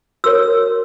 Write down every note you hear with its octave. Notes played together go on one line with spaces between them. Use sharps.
F#4 A#4 C#5 E6